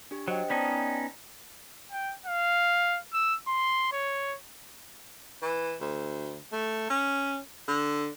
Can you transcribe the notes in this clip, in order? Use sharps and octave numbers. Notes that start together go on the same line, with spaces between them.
D4 G4
F#3 C5 D#5 G5
B3 C#4 D#4 D5 G5 A5
G5
F5
E6
C6
C#5
E3
D2
A3
C#4
D3